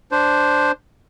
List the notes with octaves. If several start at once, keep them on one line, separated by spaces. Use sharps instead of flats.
D4 C5